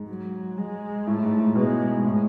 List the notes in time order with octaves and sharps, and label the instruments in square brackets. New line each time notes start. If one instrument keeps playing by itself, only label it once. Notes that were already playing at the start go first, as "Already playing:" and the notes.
Already playing: [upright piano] G#2
[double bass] F#3
G#3
[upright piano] A2 [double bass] A3
[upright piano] G#2
A2
[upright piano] B2 [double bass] G#3
[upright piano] G#2
A2